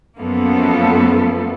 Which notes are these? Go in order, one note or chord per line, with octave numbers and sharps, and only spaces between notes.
F#2 F3 A#3 B3 F4 A4